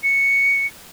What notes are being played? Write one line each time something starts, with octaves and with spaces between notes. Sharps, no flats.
C#7